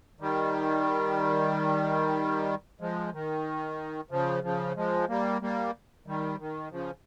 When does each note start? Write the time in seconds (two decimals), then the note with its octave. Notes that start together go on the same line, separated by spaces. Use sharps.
0.20 D#3 G3
2.80 F3 G#3
3.13 D#3
4.11 C#3 F3
4.43 C#3 F3
4.76 F3 G#3
5.09 G3 A#3
5.41 G3 A#3
6.07 D#3 G3
6.39 D#3
6.71 C#3 F3